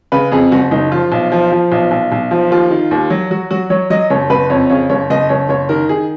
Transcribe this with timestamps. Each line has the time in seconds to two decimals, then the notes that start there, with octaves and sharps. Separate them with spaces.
0.12 C#3 B4
0.32 F2 G#4
0.52 F#1 F#4
0.71 F#1 D#4
0.92 F3 F4
1.12 B1
1.32 F3
1.52 F3
1.72 B1
1.91 B1
2.12 B1
2.31 F3
2.51 D#2 F4
2.71 D#3
2.91 D#2
3.10 F#3
3.31 F#3 F#4
3.51 F#3 F#4
3.70 F#3 C#5
3.90 F#3 D#5
4.10 F#1 C#5
4.30 F#1 B4
4.50 F2 C#5
4.69 C#3 C#5
4.90 F#1 C#5
5.10 F#1 D#5
5.29 F#1 C#5
5.49 F#1 C#5
5.69 D#3 A#4
5.89 D#3 G#4